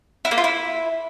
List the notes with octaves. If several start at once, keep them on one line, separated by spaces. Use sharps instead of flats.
E4
A#3
F4
E4